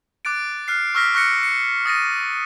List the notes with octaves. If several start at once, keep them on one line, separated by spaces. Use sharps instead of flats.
D6 F#6 A6 D7
F6 F#6 C7
C#6 E6 F6 A#6 B6
C#6 F6 F#6 A#6 C#7
C#7
D#6 A6 A#6 D#7